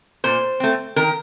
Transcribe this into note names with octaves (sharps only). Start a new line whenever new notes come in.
A#2 C5
A3 C4
D#3 A#4